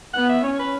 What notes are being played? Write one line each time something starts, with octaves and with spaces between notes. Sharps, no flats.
B3 F#5
E5
C#4 C#5
B4